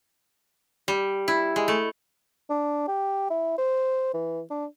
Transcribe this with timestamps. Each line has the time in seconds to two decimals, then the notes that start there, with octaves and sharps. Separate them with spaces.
0.88 G3
1.28 E4
1.56 G#3
1.68 A3
2.50 D4
2.88 G4
3.30 E4
3.58 C5
4.14 E3
4.50 D4